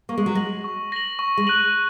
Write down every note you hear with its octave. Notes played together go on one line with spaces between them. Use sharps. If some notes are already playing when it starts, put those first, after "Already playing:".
A#3 C#6
G#3
F#3
G#3 A#6 F#7
C#6
A#6 F#7
C#6
G#3
F#6 D#7 F#7